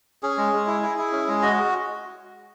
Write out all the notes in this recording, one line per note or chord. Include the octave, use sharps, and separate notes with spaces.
C#4 G#4
G#3
G#3
E4
E4
E4
C#4
G#3
F#4 D#5